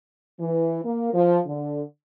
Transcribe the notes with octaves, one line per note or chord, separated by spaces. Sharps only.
E3
A#3
F3
D3